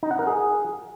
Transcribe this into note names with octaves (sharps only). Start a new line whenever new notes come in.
D#4
F#5
A#4
G#4